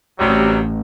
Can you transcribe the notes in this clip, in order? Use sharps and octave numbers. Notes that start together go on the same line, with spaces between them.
A1 C3 F#3 G3